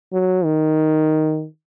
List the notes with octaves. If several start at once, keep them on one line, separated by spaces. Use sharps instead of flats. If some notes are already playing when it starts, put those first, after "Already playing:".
F#3
D#3